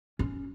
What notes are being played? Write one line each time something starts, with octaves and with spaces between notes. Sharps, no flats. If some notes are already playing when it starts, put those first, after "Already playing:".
C#4